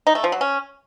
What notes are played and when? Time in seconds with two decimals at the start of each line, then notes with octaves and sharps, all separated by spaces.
0.07 D#4
0.15 A3
0.24 F3
0.32 F#3
0.41 C#4